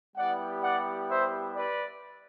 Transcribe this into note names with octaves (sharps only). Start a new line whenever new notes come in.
G3 B3 E4 G4 D5 F#5
D5 F#5
C5 E5
B4 D5